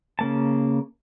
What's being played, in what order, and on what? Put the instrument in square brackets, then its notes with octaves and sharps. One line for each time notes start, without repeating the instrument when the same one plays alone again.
[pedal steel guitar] C#3 A#3 A5